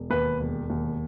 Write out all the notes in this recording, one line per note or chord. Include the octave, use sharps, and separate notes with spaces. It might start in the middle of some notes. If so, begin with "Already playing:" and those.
Already playing: E1
D#2 B4
E1
D#2